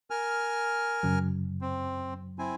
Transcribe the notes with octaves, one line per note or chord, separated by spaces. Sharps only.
A#4 G#5 F6
F#2 C#3 F#3
C4
C4 E4 G#5